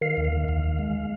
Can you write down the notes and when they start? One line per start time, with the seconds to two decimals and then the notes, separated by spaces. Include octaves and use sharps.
0.01 D#3 F5
0.17 D#2
0.25 F5
0.33 D#3
0.48 D#2 F5
0.64 D#3
0.79 G#3